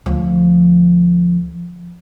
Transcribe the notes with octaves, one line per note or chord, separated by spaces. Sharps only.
D2 F3